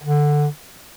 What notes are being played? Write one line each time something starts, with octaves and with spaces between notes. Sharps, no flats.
D3